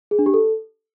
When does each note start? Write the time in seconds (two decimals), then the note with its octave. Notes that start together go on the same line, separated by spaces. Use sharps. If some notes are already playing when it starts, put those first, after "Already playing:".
0.11 G#4
0.19 D4
0.26 G4
0.34 A4